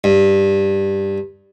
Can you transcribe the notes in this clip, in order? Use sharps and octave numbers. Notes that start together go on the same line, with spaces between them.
G2